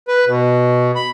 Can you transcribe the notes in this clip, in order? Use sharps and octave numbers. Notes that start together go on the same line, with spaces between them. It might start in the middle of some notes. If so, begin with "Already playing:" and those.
B4
B2
B5